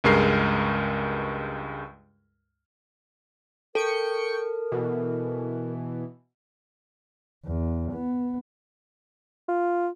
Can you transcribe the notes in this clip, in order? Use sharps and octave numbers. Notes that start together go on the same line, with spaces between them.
C#2 G2 G#3 A#4 C7
A4 A#4 G5 C#6 C#7
B2 E3
E2
B3
F4